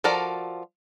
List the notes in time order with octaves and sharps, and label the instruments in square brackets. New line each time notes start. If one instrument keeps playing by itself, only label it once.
[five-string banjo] F3 F#4 A4 A#4 D5